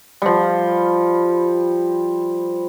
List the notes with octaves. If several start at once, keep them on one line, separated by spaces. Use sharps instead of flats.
F3 G3